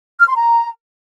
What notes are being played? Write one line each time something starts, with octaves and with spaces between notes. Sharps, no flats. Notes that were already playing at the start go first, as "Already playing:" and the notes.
F6
C6
A#5